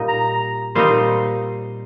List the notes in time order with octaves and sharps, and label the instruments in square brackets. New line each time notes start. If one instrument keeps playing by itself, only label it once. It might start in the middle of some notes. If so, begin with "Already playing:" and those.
Already playing: [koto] A#2 G3 A#3 D#4
[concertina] A#5
[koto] A#2 G3 C4 D#4 [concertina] C6